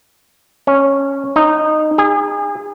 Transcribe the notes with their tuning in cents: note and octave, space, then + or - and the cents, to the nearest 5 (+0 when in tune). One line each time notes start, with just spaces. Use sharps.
C#4 -10
D#4 -15
G#4 -35